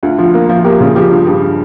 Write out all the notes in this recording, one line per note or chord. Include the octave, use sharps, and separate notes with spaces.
D2 F4
F3 F4
A#3 F4
F3 F4
A#3 G4
C#3 F4
F3 G4
G2 F4
G2 G4
F4